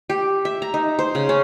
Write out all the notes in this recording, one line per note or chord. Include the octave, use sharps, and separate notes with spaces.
G4
E5
A#5
D#4
C5
C#3
C#4